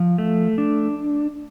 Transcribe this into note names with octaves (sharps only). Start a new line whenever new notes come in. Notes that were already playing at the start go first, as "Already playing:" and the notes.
Already playing: F3
A3
D4